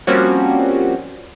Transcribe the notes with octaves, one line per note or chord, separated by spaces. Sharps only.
F3 G3 A#3 C4 C#4 F#4